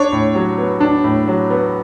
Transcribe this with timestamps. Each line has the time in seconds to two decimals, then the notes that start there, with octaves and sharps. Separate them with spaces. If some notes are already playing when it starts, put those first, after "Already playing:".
Already playing: D4 C#5
0.12 A2
0.35 F#3
0.58 B3
0.80 D4
1.04 A2
1.28 F#3
1.50 B3